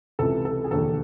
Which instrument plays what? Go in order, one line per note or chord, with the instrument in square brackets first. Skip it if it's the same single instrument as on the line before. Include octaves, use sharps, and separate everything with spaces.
[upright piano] C#2 C3 E3 A4
A4
G#4
E1 D#2 D3 A4